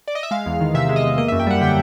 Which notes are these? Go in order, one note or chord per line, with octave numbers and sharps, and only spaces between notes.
D5
D#5
E5
G#3 F5
E2
D#3
C3 E5
G#3
D#5
E2
A#3 D#5
F#2 E5
G5
G3 F#5
D3 G5